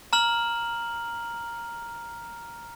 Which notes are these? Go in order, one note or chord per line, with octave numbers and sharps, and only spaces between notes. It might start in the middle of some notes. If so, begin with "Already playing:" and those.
A#5 F6 F#7